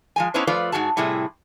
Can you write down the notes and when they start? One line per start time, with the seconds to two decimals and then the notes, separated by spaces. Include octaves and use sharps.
0.16 F3 G#3 G#5
0.34 B3 C#4 D4 E4 B4 C5
0.47 F3 A3 F4 B4 C5 D5
0.72 G#2 F3 F#4 G#4 A5
0.97 A2 C3 G3 E4 G#4